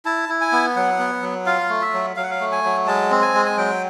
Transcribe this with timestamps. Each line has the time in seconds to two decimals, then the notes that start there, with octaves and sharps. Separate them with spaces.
0.05 E4 A5
0.29 E4
0.41 G#5
0.52 B3
0.76 F#3 F#5
0.99 B3
1.22 F#3
1.46 F4 F5
1.69 A3
1.81 E5
1.93 F#3
2.16 F#3 F5
2.23 F#5
2.31 F5
2.40 A3
2.52 G#5
2.64 F#3
2.87 G#3 A5
3.11 C4
3.22 G#5
3.35 G#3
3.46 G#5
3.57 F#3 G5